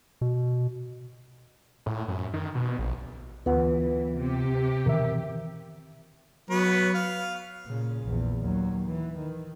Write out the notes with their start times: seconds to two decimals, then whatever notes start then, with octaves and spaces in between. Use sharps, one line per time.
0.21 B2
1.86 A2
2.08 F#2
2.34 D#3
2.55 B2
2.79 A#1
3.46 D2 E3 B3 F4 B4 F#5
4.18 C3 G4
4.86 B2 D#3 E3 A#4 E5
6.50 F#3 B3 B4 C#5
6.94 F5
7.66 A#2 C#3
8.05 A#1 E2
8.40 D#2 F#3
8.87 E3
9.18 D#3